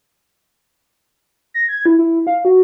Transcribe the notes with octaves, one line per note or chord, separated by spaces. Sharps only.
A#6
G#6
E4
E4
F5
F#4